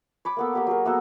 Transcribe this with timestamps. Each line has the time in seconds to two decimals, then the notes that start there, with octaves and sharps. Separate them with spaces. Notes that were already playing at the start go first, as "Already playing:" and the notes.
0.25 C#5 B5 D6
0.37 A#3 B3 A4
0.53 A#3 G4 C#5
0.67 F#3 G#4 A#4
0.85 A#3 B3 F#4 A4